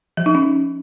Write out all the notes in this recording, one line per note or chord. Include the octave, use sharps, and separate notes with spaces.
F3
D#4
C#4